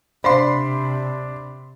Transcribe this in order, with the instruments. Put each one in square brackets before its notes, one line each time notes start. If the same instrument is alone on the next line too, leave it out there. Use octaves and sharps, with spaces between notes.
[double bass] C3 [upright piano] D4 [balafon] C5 D5 F5 [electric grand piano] B5 C6